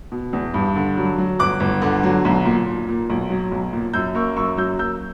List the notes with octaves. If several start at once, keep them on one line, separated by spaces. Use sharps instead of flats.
B2
E2
G2
D3
F#3
F#3
G1 D6 F#6
G1
D3
F#3
B1
A#2
A#2
A#2
B1
F#3
B1
A#2
F#2 E6 G6
A#3 C#6 E6
F#2 C#6 E6
F#3 E6 G6
A#3 E6 G6